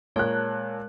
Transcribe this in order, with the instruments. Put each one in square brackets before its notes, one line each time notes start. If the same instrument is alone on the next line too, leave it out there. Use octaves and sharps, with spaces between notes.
[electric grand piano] A#2 [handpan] G#3 A#4 [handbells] C#5 [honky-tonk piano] A5 F#6